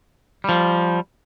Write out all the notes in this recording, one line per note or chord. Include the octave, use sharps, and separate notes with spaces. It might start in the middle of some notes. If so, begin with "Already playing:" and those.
F3 G3